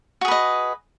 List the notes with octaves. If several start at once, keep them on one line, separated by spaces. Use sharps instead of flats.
F#4 G#4 B4 D#5